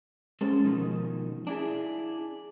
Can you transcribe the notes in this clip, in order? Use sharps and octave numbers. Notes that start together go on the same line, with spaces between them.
G#3 C#4 A4 C5
B2 D#3 F3
D4 E4 G#4